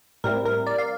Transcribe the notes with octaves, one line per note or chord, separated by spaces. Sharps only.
A2 G3 C4 E4 A#4
A#4
D5
F5